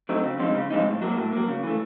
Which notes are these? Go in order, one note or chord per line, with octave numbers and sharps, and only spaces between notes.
F#3 A3 C4 D#4
C#3
F3 G#3 C4 D#4
C#3
F3 G#3 C4 D#4
A2
F#3 A#3
A2
F#3 A#3
C#3
E3 A3